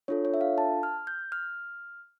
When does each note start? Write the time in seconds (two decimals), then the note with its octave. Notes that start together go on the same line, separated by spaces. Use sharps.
0.08 D4 F4 A4 C#5
0.25 C#5
0.34 E5
0.41 F5
0.58 A5
0.83 F6
1.07 G6
1.32 F6